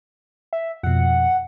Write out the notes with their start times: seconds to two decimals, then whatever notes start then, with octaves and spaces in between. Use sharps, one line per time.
0.53 E5
0.83 F2 B2 F#5